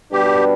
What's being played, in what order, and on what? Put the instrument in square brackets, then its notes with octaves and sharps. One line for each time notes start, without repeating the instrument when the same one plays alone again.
[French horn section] B2 G3 D4 B4 [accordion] G4